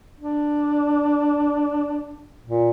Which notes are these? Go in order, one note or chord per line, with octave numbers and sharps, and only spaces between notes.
D4
A#2